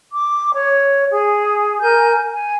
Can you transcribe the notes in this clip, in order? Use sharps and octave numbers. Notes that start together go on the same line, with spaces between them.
D6
C#5
G#4
A#4 G#5 G6
G#5